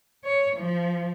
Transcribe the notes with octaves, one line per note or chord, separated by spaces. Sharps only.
C#5
F3